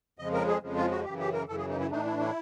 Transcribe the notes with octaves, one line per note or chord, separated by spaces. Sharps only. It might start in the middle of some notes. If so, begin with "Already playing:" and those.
F2 C#3 F3 G#3 D#5
A#4
G#4
F2 C#3 F3 G#3
F4
F#4
F#2 C#3 E3 G4
G4
A#4
F#2 C#3 E3 A4
G#4
D#4
E4
A2 E3 A3 D4 D#4
E4
E4